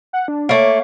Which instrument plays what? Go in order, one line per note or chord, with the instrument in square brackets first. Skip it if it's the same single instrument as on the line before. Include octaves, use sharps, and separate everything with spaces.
[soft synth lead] F#5
D4
[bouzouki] A3 A#3 [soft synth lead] C#5